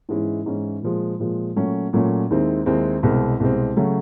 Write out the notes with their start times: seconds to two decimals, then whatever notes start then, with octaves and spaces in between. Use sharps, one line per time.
0.09 G#2 E3 G#3 C#4 E4
0.46 G#2 E3 G#3 C#4 E4
0.82 A#2 F3 G#3
1.20 A#2 F3 G#3
1.56 A#2 F#3 A3 C#4
1.93 A#2 F#3 A3 C#4
2.30 D#2 D#3 G#3 C4 E4
2.66 D#2 D#3 G#3 C4 E4
3.03 C2 B2 G#3 C4
3.40 C2 B2 G#3 C4
3.76 C#3 F#3 A3 C#4